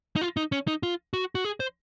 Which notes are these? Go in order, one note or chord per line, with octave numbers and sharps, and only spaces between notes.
D#4
F4
D#4
C#4
D#4
F4
F#4
F#4
G#4
C5